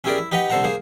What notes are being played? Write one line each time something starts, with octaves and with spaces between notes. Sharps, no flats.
C#4 E4 G4 G#4 A#4 D5
E4
D#4 G4 B4 D#5 F#5 A#5
C2 D3 A4 C5 F#5 A#5
A#3 G#4 C5